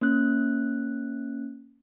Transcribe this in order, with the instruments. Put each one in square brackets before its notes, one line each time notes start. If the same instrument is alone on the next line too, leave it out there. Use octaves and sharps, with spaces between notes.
[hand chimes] A#3 C#4 F#6